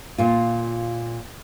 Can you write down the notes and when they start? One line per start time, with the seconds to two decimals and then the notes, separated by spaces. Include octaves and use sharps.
0.18 A#2 F4